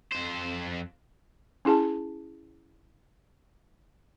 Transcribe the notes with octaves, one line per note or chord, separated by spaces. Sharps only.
F2 C5
C#4 E4 G#4 A5